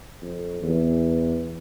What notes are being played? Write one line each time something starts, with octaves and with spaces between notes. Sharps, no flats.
F2
E2